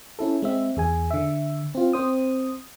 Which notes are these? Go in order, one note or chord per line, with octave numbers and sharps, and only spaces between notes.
C#4 E4 A4
G#3 C4 E5
E2 G#4 G#5
D3 E5
C4 F4
C4 C5 D#6